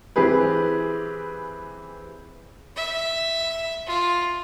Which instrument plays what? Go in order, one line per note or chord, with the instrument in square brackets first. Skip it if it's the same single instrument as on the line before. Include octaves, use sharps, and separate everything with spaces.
[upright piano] E3 C4 G4 G#4 B4
[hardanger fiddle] E5
F4